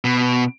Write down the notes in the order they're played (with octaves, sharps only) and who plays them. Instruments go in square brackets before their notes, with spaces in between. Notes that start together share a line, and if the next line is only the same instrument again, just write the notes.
[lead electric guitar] B2